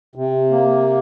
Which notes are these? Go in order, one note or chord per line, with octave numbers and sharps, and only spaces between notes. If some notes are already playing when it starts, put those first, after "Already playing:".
C3
A#3